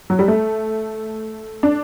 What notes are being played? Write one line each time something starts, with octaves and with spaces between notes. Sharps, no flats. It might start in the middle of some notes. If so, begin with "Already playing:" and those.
F#3
G3
A3
D4